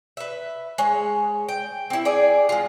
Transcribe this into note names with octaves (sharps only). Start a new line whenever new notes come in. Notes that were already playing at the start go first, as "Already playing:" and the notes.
B4 E5
G#3 C#5
G5
C4 E4
G#4 D5
G#3 F4